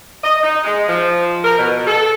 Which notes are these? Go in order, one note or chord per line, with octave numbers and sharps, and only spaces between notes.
D#5
D#4
G#3
F3
A#4
B2
A4